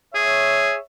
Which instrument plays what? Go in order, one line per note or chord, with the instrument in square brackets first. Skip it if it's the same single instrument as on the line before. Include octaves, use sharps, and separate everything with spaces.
[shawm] G#4 [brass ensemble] C#5 E5